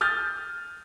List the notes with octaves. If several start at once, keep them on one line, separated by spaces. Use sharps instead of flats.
D#6 F6 G6 A6